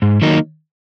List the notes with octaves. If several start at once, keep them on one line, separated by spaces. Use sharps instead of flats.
G#2
D#3 F#3 A#3 D#4